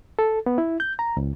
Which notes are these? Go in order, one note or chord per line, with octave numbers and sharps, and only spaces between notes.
A4
B3
E4
G6
A#5
C#2